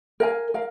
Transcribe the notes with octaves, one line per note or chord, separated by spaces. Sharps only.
A#4 F5 G#5
A#4 F5